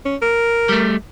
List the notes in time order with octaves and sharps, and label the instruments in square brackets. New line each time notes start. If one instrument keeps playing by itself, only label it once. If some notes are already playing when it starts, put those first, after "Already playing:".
[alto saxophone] C#4
A#4
[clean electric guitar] G3 A3